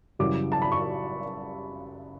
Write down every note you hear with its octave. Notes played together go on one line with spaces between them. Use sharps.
F#2 C#3 E3 G3 D6
A5
B5
C#6